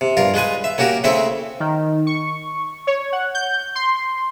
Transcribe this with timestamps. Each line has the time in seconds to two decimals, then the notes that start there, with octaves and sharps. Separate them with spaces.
0.01 C3
0.17 G2 F4 A#4
0.34 G#3 F4 B4 G#5
0.64 E5
0.78 A#3 C#4 F#4 G4 A#4
1.04 C#3 A3 C4 E4 E5
1.60 D#3
2.07 C#6
2.87 C#5
3.12 F#5
3.34 G6
3.75 C6
3.96 C6